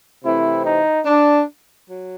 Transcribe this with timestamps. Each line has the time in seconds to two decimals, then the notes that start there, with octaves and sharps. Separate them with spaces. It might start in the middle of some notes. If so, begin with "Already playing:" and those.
0.24 C3 E3 A3 C4 E4
0.65 D#4
1.06 D4
1.87 F#3